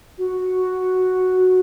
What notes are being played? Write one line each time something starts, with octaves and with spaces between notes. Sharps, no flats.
F#4